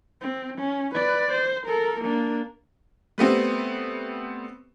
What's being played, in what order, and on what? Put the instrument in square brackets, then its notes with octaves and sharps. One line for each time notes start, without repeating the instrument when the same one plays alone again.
[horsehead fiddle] C4
C#4
B4 D5
C5
A4 A#4
A#3 D4
[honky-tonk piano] G3 A3 B3 C4